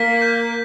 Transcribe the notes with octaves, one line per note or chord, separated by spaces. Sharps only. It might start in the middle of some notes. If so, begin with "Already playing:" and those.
Already playing: A#3 B6
G6